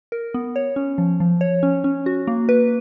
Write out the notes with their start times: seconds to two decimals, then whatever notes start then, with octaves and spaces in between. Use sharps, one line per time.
0.12 A#4
0.34 B3
0.56 C#5
0.76 C#4
0.98 F3
1.20 F3
1.41 C#5
1.63 C#4
1.84 C#4
2.06 F#4
2.27 A#3
2.49 B4